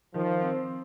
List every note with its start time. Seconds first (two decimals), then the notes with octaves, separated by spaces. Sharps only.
0.14 D#3 F3
0.41 C4